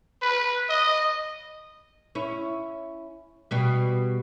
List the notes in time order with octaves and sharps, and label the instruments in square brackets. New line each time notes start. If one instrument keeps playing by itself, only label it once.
[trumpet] B4
D#5
[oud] C#4 E4
B2 G3